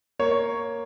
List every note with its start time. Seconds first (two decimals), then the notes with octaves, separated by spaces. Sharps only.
0.19 A#3 C#5
0.31 C#5